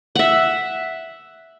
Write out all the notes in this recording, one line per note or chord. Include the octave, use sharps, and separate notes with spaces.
E5 F#5